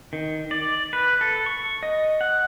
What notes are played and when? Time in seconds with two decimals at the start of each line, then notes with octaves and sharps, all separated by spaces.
0.13 D#3
0.51 D5
0.93 B4
1.21 A4
1.46 C#6
1.83 D#5
2.21 F#5